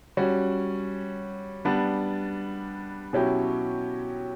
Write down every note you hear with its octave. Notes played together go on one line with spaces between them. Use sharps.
G3 C#4 F#4
G3 B3 D4
B2 F#3 C#4 E4 G4